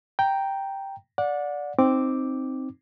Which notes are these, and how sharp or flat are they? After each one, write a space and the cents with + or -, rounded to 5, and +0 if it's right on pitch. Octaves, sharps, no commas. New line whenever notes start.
G5 +0 A#5 +0
D5 -10 F#5 -30
C4 +0 D#4 +0 D6 +0